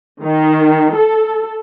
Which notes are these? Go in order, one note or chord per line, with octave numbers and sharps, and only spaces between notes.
D#3
A4